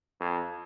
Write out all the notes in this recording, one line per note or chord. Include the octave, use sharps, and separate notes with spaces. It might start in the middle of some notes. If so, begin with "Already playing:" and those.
F2